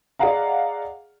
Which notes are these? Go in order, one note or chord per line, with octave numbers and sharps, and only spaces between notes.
G#4 D5 D#5 F5 F#5 A#5